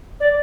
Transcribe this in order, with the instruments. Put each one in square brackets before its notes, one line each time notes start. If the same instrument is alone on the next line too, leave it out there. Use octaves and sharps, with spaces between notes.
[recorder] D5